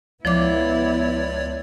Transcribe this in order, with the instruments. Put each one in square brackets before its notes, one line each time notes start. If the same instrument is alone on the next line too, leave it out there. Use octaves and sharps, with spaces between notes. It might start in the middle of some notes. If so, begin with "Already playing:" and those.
[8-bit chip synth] C#2 C#5 D5 [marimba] F3 D6 [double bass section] B3 [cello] E4